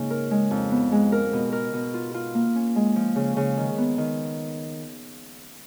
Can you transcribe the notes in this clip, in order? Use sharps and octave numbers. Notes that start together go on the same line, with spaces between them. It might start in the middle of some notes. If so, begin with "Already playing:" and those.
Already playing: G#2 C#3 A#3 D#4
A#4
G#3
F2
B3
G#3
A#4
B2
A#4
B2
F4
F4
A#3
C#4
G#3
F3
C#3
C#3
D#3
B3
D#3